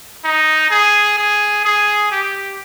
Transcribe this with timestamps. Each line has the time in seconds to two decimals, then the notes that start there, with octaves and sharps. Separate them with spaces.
0.24 D#4
0.70 G#4
1.18 G#4
1.65 G#4
2.12 G4